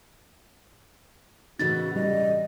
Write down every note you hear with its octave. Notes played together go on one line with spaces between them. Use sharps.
A2 C#3 E3 D#4 F#4 A6
G3 D#5